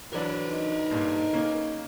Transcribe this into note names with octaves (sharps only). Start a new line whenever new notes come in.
E3 F#3 D4 A#4 B4
D#4
G2 A#2
C#3 A#3 C#4